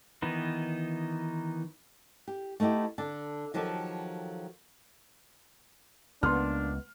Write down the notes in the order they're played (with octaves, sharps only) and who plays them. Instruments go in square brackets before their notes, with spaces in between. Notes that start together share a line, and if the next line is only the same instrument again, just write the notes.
[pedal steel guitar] D#3 E3 B3 D#4
[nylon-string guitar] G4
A3 B3 D#4 E4 G4
D3 A5
D#3 F3 F#3 G4 A4
[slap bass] C#2 [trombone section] A#3 D4 [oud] B3 [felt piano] C6 F6